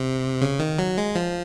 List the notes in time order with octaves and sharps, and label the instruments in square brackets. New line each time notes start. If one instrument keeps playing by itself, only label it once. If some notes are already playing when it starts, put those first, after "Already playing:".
Already playing: [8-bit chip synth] C3
C#3
D#3
F#3
G#3
F3